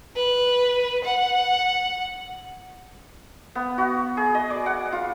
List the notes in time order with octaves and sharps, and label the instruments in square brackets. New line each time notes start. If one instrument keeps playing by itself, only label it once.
[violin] B4
F#5
[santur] B3
F#4
G#4
D#5
D5
F#5
F4